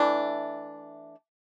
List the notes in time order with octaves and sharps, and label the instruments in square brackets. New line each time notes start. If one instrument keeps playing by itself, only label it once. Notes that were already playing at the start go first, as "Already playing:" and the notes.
Already playing: [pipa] E3 A3 D4